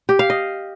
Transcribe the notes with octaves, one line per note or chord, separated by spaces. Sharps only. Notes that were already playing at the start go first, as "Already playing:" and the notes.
G4
F5
D#5